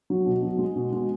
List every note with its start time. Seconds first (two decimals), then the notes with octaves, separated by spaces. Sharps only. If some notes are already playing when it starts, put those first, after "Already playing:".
0.10 F#3
0.26 B2
0.43 F#3
0.59 G#3
0.76 B2
0.92 G#3